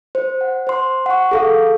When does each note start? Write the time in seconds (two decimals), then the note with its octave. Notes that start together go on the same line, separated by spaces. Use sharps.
0.15 C5
0.41 F#5
0.67 C5 C6
1.06 F#5 C#6
1.31 G#4 A4 F5